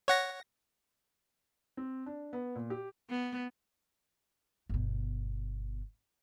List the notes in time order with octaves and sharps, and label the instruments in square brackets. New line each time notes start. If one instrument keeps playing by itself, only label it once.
[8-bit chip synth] C#5 F#5 A#6
[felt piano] C4
D4
B3
A#2
G4
[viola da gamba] B3
[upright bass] G1 B2